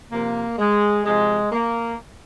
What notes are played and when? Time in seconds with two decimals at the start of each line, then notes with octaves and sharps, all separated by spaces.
0.11 C3 F3 A#3
0.58 G#3
1.05 C3 F3 G#3
1.52 A#3